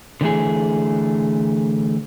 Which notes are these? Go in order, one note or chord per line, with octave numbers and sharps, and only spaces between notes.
D3 E3 A3 G#4